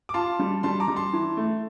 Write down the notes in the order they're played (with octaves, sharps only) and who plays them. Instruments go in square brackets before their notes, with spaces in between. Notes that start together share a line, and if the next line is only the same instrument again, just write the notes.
[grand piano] D6
[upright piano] F4 [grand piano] A5 C6
[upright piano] G3
[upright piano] G3 [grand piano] A5 C6
[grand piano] A#5 D6
[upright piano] G3
[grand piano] A5 C6
[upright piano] E3
A3